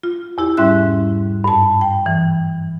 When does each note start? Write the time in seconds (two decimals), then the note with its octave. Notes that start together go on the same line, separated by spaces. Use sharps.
0.03 F4
0.38 E2 E4 G4
0.57 G#2 G3 C#4 E5 F#6
1.44 G2 A5
1.81 G5
2.06 E3